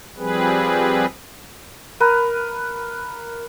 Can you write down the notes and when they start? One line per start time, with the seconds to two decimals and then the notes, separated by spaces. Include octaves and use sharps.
0.17 F3 G3 C4 G#4 B4
2.00 A#4 B4